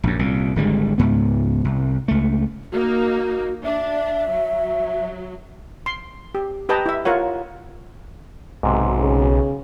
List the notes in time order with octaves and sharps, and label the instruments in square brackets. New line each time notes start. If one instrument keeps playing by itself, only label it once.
[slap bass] A#1 F#2
C2 A#2
G#1 D3 G3 G#3
C#2 G#2 B3
C2
C#2 A3
[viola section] A#3 D#4 [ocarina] F#4
[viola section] D4 [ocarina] E5
[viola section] F#3
[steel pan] C6
G4
G4 B4 D#5 G5 A5 A#5
E4 E5
F4 A#4 C#5 F#5
[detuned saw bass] B1 [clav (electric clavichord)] G#2 C3
[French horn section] C#3